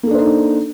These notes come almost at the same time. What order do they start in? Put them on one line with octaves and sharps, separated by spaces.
A#3 A4 D4 C5 D#4